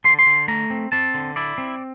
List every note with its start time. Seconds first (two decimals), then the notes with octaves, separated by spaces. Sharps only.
0.04 D3 C6
0.19 C6
0.26 D3
0.48 A3 A#5
0.70 C4
0.92 C4 A5
1.14 D3
1.36 E4 D5
1.58 C4